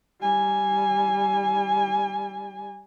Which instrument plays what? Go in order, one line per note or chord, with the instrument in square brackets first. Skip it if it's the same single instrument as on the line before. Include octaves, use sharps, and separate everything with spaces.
[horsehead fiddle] G3 G#5